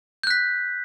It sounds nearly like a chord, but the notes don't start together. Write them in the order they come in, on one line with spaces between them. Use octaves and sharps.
G6 F#6 B6